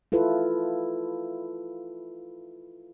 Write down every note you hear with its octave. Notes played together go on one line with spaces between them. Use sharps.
E4 F4 A4 B4